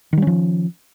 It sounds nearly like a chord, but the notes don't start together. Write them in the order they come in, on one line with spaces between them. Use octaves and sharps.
D#3 G3 C#4 F3